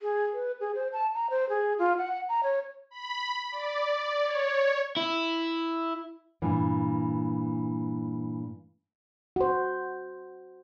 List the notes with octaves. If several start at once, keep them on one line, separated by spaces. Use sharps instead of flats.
G#4
B4
G#4
C5
A5
A#5
C5
G#4
F4
F#5
A#5
C#5
B5
D5
C#5
E4
G2 A#2 E3
F#4 C5